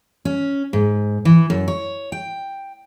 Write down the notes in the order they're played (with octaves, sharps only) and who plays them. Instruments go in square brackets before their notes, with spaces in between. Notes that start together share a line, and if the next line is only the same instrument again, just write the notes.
[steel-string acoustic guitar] C#4
G#2
E3
F#2
C#5
G5